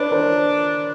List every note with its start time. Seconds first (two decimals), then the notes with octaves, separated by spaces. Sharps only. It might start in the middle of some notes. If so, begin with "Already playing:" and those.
Already playing: D4 B4 C#5
0.11 A#4 C5